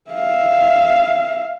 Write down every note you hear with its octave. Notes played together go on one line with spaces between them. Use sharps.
E5 F5